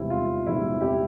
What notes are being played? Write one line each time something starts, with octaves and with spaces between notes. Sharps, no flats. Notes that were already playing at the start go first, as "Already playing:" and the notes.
Already playing: E1 E2 C3 G3 E4
F4
E1 E2 C3 G3 E4
E4 G4